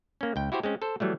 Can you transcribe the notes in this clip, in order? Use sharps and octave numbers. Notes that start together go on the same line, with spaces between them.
A#3 C#4
C#2 G5
E4 F#4 G4 C5
G#3 C4 C#4
A4 C5
E3 F#3 G3 A3